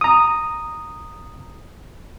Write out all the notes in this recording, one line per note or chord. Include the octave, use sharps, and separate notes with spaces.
A#5 D#6